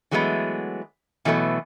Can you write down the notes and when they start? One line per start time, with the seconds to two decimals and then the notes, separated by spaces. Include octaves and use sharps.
0.11 E3 F#3 G#3 A3 B3
1.25 B2 E3 F#3 A3 B3